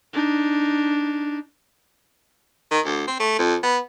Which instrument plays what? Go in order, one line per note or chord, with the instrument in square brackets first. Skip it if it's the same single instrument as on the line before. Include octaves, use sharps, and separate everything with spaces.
[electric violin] D4 D#4
[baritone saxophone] D#3
D2
C4
A3
F2
B3